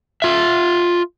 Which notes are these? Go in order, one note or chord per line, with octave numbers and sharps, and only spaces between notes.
F4 E5